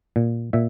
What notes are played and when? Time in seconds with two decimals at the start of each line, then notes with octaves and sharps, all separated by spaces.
0.16 A#2
0.53 A#2 E5